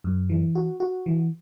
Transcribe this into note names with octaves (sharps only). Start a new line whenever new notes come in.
F#2
E3
F#4
F#4
E3